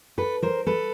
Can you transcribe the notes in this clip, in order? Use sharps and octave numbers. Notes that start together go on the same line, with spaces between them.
A4 B4
A#4 C5
A4 B4